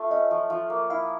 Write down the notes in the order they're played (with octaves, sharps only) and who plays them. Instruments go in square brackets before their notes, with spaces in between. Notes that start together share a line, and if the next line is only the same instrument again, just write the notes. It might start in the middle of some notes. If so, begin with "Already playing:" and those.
Already playing: [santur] A3 F4
[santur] C#4 [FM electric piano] D#5
[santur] F3
F3
A#3
[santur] E4 [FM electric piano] F5